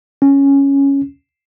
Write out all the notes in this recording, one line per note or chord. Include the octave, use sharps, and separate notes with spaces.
C#4